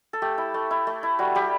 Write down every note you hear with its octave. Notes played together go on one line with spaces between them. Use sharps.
A4
A3 G4
E4
A3
E4
A3
E4
G3 F#4
G3 G4